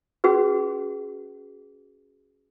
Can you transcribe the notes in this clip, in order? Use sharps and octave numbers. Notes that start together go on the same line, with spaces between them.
C#4 F#4 G#4 B4